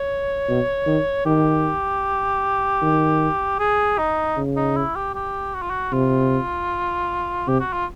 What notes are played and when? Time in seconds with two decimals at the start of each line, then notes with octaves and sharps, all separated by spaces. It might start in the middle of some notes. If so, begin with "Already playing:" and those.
Already playing: C#5
0.49 B2
0.87 D#3
1.25 D#3 G4
2.82 D#3
3.59 G#4
3.98 D#4
4.36 C#3
4.56 D#4
4.76 E4
4.95 G4
5.14 G4
5.54 F#4
5.62 F4
5.70 F#4
5.92 C3 F4
7.48 C3 G4
7.60 F#4
7.73 F4